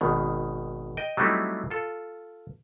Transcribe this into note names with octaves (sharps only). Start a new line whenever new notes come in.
G#1 B2 D#3
D#5 G5
F#3 G3 A3 C4 D#4 E4
F4 A4